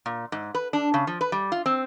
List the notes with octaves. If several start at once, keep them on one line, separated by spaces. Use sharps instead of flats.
A#2
G#2
B4
D4
C#3
F3
B4
G3
F4
C4